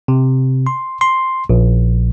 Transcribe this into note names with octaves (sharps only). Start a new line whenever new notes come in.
C3
C6
C6
A#1